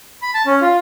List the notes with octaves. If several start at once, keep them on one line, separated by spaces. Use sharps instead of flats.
B5
A5
C#4
F4